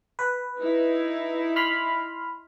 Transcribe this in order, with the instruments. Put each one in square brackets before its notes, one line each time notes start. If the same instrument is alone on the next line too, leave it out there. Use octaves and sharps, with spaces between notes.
[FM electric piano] B4
[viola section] D#4 E4
[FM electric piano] B5 C6 F6